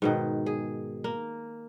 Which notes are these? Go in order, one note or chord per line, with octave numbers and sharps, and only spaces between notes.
G#2 B2 D#3
G#4
A#3